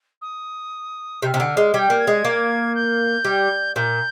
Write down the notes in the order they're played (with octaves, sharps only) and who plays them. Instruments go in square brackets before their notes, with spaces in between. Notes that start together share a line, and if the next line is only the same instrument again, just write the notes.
[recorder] D#6
[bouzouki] C3 [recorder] G6
[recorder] F6
[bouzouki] C3
D3
G#3
[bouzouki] G3 [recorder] G#6
[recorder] G6
[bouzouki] A#3
[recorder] G#6
[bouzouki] G#3
A#3
[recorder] G6
[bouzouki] G3
[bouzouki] A#2 [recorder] G6